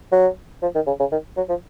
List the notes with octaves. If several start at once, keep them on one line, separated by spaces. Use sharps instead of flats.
F#3
F3
D#3
C#3
C#3
D#3
F#3
F3